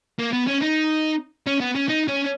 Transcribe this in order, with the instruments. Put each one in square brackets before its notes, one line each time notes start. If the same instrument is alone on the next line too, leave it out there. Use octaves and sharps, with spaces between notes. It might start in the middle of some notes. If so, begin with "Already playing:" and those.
[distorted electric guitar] A#3
B3
C#4
D#4
C#4
B3
C#4
D#4
C#4